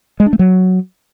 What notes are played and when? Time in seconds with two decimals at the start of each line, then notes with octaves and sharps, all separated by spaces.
0.20 G#3
0.26 D4
0.33 A3
0.39 F#3